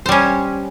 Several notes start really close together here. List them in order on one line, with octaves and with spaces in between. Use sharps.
C5 G3 C#4